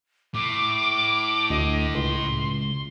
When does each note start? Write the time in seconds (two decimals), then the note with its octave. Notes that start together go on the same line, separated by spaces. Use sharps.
0.34 A2 D6
1.50 D2 D#5
1.94 C#2 C6